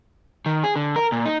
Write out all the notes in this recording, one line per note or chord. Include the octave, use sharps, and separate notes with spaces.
D#3
G#4
D3
A#4
A#2
D#4